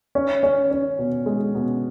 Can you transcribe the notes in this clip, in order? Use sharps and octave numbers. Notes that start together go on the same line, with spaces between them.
C#4
C#4
C#4
B2
G#3
B2